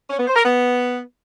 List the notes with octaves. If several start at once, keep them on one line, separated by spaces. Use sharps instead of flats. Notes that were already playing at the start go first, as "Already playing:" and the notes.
C#4
B3
C5
A#4
B3